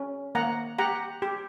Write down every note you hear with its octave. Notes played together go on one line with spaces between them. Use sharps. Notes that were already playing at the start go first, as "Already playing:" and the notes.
Already playing: C#4
A#3 F#5 A#5
G4 F#5 A#5
G4